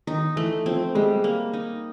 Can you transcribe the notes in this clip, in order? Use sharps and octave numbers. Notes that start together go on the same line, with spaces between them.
D#3 D#4
E3 A3
F3 C4
G3 G#3
A#3
D#4